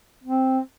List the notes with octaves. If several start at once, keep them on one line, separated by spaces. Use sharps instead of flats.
C4